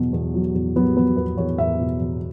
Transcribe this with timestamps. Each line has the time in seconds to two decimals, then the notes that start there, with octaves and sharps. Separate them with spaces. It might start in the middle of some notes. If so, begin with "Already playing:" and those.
Already playing: E2 B2 F#3
0.13 E2
0.34 F#3
0.54 E2
0.76 F#3 B3
0.96 E2 B3
1.17 E2 B4
1.37 E2 C#5
1.58 E2 E5
1.80 B2
2.00 E2